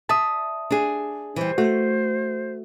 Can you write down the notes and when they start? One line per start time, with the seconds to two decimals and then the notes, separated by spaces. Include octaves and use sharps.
0.09 D5 E5 A5 D#6
0.71 D4 G#4
1.36 E3 G3 C5
1.58 A3 F#4